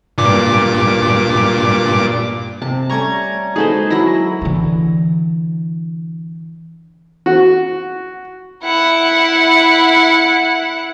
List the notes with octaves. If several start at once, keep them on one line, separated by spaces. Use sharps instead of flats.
G2 A#2 D6
C3 A5
G3 A3 C#4 A#5 C#6 G#6
G#3 D#4 F#4 G#4 A4 B4 C5
F#3 E4 B5 A#6
D3 E3
F#4
E4 F#5